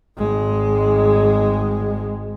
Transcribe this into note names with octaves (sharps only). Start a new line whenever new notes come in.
G#1 G#3